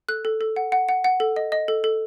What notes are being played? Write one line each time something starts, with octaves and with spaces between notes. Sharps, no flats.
A4 F#6
A4
A4
F#5
F#5
F#5
F#5
A4
D#5
D#5
A4
A4